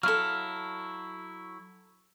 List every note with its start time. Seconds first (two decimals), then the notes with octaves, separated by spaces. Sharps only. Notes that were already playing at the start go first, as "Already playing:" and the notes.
0.03 F#3 E4 A4 F5 F6